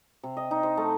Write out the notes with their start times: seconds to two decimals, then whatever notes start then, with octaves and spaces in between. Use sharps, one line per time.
0.23 C3
0.37 D#5
0.51 D#4
0.63 C5
0.77 A3